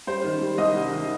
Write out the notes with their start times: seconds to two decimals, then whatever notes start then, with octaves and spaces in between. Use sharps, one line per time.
0.07 G3 C5
0.24 D#3
0.41 G3
0.58 C2 D#5
0.75 G3
0.92 D#3